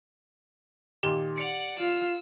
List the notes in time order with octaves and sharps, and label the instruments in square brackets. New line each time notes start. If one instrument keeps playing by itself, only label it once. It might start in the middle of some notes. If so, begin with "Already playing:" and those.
[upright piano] A#2 D#3 [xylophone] G4 E7 G7
[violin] D5 F#5 [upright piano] C#7 F7
[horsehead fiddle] F4 F5 [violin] E6